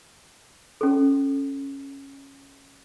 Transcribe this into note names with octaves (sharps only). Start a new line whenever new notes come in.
C#4 A4